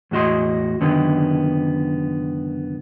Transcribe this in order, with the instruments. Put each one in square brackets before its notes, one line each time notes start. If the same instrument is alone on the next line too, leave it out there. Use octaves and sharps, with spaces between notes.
[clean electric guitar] E2 A2 F#4 D#5 C6
C#2 F#2 D3 D#3 B3